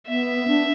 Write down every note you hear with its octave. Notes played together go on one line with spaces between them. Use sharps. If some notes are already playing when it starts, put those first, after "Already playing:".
B3 E5
D4